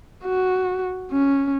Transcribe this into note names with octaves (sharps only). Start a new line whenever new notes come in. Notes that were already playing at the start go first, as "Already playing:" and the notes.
F#4
C#4